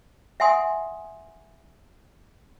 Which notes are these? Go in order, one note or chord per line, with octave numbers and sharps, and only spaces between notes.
E5 F#5 G#5 C6 D#6